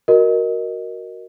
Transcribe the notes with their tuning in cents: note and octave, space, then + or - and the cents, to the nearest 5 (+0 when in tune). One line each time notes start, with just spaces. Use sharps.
F#4 +0 A#4 +0 D#5 +0